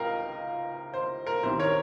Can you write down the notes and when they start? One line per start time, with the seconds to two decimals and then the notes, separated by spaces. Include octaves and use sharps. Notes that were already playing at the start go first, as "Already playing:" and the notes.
Already playing: C#2 C3 A#4 D#5 F5 G5
0.94 C5
1.26 A#4
1.43 C2 C3 D#3 C5
1.59 A#4 C#5